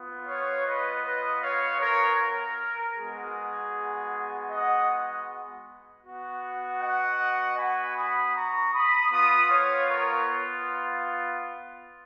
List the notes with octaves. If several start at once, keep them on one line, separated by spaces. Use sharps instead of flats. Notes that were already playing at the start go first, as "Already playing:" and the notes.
Already playing: B3 F4
C#5 F5
B4 D#5
B4 D#5
C#5 F5
A#4 C#5
A#4
G#3 B3 F#4 G#4
D#5 F#5
B3 F#4
D#5 F#5
G#5 B5
B5 D#6
A#5 C#6
B5 D#6
B3 F4 B5 D#6
C#5 F5
A#4 C#5